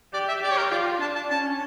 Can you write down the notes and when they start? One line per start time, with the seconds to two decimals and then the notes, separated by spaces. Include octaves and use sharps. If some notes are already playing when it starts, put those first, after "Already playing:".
0.14 G4 D5
0.28 E5
0.42 G4 D5
0.51 C#5
0.57 A#4
0.71 F4 D5
1.01 D4 A5
1.15 A5
1.30 C#4 A5